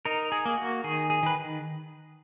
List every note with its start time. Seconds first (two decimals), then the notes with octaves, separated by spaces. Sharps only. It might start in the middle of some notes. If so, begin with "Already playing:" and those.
0.05 D#4 A#4
0.32 G#4
0.45 A#3
0.58 F#4
0.84 D#3 G#4
1.10 G#4
1.23 D#3 B4